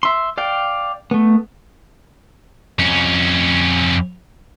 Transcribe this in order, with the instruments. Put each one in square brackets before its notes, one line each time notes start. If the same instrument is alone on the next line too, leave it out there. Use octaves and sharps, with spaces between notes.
[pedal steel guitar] E5 C6
D5 F5 G5
A3 B3
[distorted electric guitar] F2 C#4